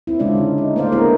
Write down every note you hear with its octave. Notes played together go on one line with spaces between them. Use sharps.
C4 E4
C#3 G#3 C#4 D4 F4 D5
D3 D#4
D#4
A3 A#3 C5 D5 F5
B3 D4 E4 G#4 A#4